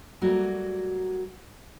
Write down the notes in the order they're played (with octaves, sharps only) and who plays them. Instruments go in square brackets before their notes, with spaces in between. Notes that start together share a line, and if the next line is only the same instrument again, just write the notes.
[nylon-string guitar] F#3 G3 A3 A#3 F#4